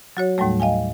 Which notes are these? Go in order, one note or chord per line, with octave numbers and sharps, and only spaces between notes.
F#3 F#4 C#5
D#2 A2 F#3 G3 A3
D#5 F5 G5 G#5